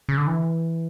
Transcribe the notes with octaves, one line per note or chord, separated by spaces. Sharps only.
C#3
D3
E3